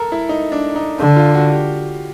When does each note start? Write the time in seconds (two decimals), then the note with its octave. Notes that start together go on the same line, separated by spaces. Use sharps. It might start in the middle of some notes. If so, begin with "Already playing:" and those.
Already playing: A4 A#4
0.12 E4
0.29 D#4
0.52 D4
0.76 D#4
0.99 D3
1.16 F4
1.35 F#4
1.52 G4